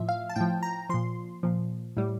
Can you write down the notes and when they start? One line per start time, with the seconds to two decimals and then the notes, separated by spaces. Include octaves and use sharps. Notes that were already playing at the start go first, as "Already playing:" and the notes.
Already playing: A2 F3 E5
0.09 F5
0.29 A5
0.36 A2 F3 G5
0.63 A#5
0.89 A#2 F3 C6
1.43 A#2 F3
1.97 A2 G3